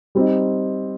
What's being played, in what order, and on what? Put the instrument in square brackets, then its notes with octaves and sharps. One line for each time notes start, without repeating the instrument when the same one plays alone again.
[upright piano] G3 C4 D#4